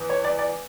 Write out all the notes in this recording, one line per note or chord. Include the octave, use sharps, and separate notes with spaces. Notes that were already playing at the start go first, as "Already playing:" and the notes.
Already playing: E2
C#5
D5
D5